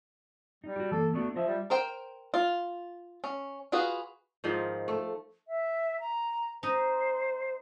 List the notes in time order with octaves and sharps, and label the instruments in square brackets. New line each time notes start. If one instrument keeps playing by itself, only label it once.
[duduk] G3 [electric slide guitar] D#4
[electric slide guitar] F#4 G4
[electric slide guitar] E3 A#3 [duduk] A4
[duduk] A3 [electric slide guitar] B3 D4 F#4
[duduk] F3 [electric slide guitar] F4 D#5 E5
[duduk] G3
[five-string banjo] A#4 C5 G5
F4
C#4
F4 F#4 G#4 B4
[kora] G#2 D#3 F3
A3
[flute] E5
A#5
[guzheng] D#4 [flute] C5